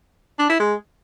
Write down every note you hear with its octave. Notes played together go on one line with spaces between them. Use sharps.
D4
E4
G#3